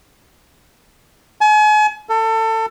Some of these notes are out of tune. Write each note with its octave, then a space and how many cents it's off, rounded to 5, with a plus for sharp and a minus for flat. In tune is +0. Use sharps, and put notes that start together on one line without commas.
G#5 +40
A4 +25